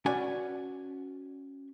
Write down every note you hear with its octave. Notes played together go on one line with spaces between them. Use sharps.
C#4 F#4 B4 D5 G#5